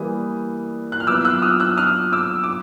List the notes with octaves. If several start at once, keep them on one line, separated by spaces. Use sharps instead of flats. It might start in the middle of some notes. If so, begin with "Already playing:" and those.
Already playing: E3 G3 A#3 D#6
F#6
F6
F#3 B3 E4 D6 E6
E6 F#6
D#6 F6
E6 F#6
D#6 F6
D6 E6
D6